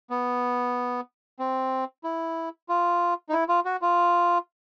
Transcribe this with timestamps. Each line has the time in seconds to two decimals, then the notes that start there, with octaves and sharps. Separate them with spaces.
0.10 B3
1.39 C4
2.04 E4
2.69 F4
3.29 D#4
3.33 E4
3.49 F4
3.65 F#4
3.82 F4